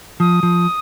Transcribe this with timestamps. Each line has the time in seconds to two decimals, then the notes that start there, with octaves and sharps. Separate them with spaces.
0.20 F3 D#6
0.43 F3